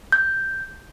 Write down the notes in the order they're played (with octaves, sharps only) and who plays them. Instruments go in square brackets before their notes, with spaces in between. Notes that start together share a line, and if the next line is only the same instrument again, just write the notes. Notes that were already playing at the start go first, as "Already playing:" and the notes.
[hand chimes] G6